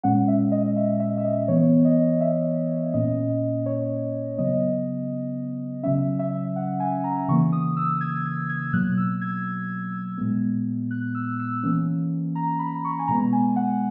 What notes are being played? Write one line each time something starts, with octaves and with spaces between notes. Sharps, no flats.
A#2 G#3 C#4 F#5
E5
D#5
E5
E5
E5
D#5
E3 B3 C#5
D#5
E5
A#2 A#3 C#4 D#5
D#5
C#5
C#3 F#3 B3 D#5
C#3 F#3 C#4 E5
E5
F#5
G#5
A#5
C#3 E3 A#3 C#6
D#6
E6
G#6
G#6
G#6
B2 F#3 A#3 F#6
E6
G#6
A#2 G#3 B3
F#6
E6
E6
E3 A#3 C#4
A#5
B5
C#6
G#5
B2 G#3 B3 A#5
G#5
F#5